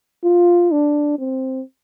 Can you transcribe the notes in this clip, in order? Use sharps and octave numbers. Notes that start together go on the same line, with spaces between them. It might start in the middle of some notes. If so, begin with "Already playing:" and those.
F4
D4
C4